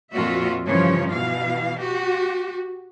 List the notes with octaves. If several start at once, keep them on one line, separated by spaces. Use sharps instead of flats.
F2 A#2 F4 F#4 E5
G2 C#3 E3 F3 G3 C#5
B2 E3 F5
F#4 G4